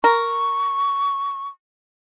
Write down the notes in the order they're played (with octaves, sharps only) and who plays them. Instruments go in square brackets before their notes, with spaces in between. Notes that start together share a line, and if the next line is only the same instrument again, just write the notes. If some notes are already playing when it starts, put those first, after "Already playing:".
[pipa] A#4 [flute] C#6